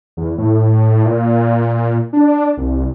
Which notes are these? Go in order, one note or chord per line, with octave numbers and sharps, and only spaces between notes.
E2
A2
A#2
D4
C2